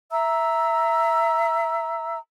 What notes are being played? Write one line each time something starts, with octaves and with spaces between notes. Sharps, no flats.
E5 A#5 E6